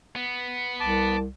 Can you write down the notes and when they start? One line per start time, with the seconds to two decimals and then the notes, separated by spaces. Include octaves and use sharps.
0.15 B3
0.80 C2 A5 D6